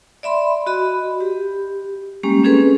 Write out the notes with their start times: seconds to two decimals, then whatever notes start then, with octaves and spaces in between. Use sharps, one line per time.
0.23 D5 E5 B5 C6
0.66 F#4 D#5 B5
1.20 G4
2.23 G3 G#3 A#3 C#4 G4
2.43 C4 C#4 G#4 A4 B4